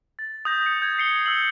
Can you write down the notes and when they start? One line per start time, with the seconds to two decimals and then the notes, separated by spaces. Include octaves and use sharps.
0.19 A6
0.45 D#6 G6 A#6
0.66 C#7
0.82 G6 G#6
0.98 C7 C#7 G7
1.26 E6 F#7